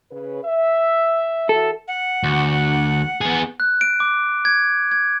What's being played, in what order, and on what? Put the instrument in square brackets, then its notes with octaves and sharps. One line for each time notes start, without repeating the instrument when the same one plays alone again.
[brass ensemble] C#3 B4
E5
[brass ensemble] E3 F#4 E5 [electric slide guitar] A4
[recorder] F#5
[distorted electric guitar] D2
B3 G#4
[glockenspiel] F#6
D7
D6
G#6
G#6